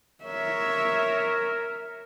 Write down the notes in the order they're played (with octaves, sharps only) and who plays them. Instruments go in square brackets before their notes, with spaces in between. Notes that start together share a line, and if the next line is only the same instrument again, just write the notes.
[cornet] A#4 [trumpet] C#5 [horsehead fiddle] E5